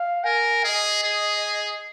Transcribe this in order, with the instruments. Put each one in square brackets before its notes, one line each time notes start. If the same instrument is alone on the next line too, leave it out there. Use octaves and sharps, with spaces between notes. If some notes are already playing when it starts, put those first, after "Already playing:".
Already playing: [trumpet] F5
[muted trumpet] A#4 [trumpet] G#5
[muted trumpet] G#4 [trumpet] D#5
[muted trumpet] G#4